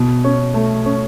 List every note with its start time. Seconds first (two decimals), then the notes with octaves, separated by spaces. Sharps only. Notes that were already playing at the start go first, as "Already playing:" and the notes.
Already playing: B2
0.24 C#4
0.54 A3
0.85 C#4